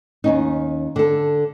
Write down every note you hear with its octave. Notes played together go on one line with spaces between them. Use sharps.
D#2 C#4 D#4
D3 A4